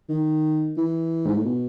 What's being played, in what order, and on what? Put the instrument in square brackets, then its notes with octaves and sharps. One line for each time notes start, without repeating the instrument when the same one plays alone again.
[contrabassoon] D#3
E3
G#2
A2
B2